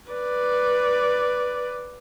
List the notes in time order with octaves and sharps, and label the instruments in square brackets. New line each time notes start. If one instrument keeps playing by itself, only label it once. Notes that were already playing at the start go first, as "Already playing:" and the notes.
[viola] B4 D5